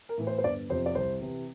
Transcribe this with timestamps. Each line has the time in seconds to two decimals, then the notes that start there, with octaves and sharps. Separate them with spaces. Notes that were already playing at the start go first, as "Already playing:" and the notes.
0.09 A#4
0.18 A2 E3
0.27 C5
0.38 C5
0.44 G1 D5
0.69 F2 C3 F3 C5
0.86 D5
0.95 C2 C5
1.21 C3 E3